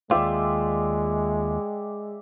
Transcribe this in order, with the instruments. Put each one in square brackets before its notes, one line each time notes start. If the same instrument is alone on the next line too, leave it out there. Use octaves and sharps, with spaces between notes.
[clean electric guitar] D#2 F4 [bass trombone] G#3 [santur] D5 E5 G5